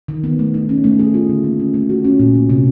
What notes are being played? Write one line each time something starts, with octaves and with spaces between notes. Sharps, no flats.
D#3
B3
A3
D#4
C#4
A3
G#4
F4
D3
A#3
C#4
A3
F#4
C#4
A#2
A#3
C3